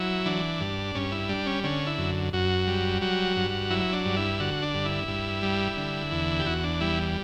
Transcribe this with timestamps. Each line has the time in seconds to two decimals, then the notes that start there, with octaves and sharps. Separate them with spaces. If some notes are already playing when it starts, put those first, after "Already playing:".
Already playing: F#3 E4
0.26 E3 D4
0.61 G2
0.95 G2 C#4
1.12 E4
1.29 G3 D4
1.46 C#4
1.64 D3 C#4
1.87 E4
1.98 F#2
2.33 F#2 F#4
2.67 G3
3.01 F#3 F#4
3.37 G2
3.70 F#3 E4
3.93 D4
4.05 G2
4.16 E4
4.40 D3 F#4
4.62 D4
4.74 G2
4.85 E4
5.08 G2
5.42 G3
5.77 D3
6.11 E2
6.39 G4
6.46 E2 F#4
6.64 D4
6.81 G3 E4